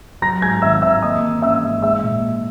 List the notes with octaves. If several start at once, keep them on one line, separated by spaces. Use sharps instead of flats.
F#3 A#5 A#6
G#2 G#5 G#6
G#1 E5 E6
G#1 E5 E6
A#3 D#5 D#6
E3
C#4 E5 E6
G#2
G#3 E5 E6
A#2